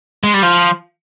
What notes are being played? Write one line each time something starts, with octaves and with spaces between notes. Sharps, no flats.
G#3
G3
F3